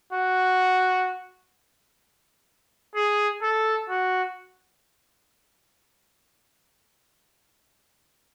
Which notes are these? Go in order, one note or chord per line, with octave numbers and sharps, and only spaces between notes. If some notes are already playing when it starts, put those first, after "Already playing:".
F#4
G#4
A4
F#4